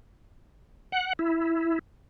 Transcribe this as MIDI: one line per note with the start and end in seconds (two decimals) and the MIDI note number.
0.92 1.13 78
1.19 1.79 64